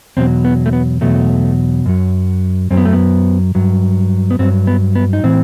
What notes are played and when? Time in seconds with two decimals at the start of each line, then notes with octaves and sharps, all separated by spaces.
0.17 E2 B2 F#3 C4
0.45 B3
0.66 A3
0.73 B3
1.01 E2 B2 F#3 A3
1.86 F#2 F#3
2.71 F#2 F#3 C4
2.77 B3
2.85 A3
2.93 B3
3.55 G2 F#3
4.31 B3
4.39 G2 F#3 C4
4.67 B3
4.95 B3
5.13 D#4
5.23 A2 E3 C4